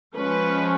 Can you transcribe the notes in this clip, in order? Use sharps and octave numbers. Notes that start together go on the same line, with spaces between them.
F3 G#3 C#4 B4